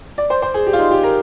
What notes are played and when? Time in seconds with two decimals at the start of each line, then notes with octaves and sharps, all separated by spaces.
0.18 D5
0.30 C5
0.42 C5
0.54 G#4
0.67 G4
0.73 F4
0.79 D#4
0.91 G4
1.03 A#4